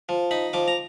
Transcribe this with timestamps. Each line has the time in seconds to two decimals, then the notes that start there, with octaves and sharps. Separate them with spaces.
0.09 F3
0.31 D#4 B5
0.53 F3 D6
0.68 A#5